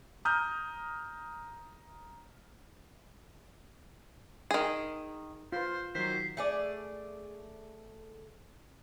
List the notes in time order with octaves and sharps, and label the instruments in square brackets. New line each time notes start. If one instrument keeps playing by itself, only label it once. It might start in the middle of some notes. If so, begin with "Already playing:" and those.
[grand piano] A#5 D#6 F6 G6
[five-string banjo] D#3 G#4
[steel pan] F4 B4 [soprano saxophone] C5
[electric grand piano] D#3 F#3 [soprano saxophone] C5 [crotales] B6 C7
[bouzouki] A3 G#4 D5